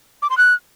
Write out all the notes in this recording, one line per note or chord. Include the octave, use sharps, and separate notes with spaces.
D6
C6
F#6